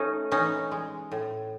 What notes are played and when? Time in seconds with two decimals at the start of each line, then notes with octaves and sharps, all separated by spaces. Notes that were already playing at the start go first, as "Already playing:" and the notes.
Already playing: A3 C#4 D#4
0.31 E3 C#4 D#4
0.72 G#3
1.11 A2